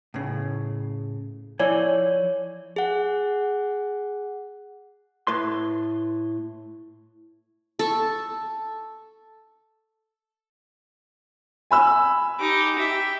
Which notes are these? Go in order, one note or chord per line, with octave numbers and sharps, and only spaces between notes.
A2 C#3
F3 E4 C#5 D5 G#5
G#4 F#5
A2 B4 C6
A4 C#6
G#5 B5 E6
D#4 G4 D6
G4 E5 G5